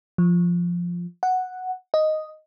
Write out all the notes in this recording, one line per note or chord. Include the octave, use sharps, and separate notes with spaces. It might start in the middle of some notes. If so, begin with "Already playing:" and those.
F3
F#5
D#5